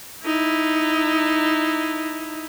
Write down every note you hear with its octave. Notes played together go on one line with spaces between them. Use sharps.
D#4 E4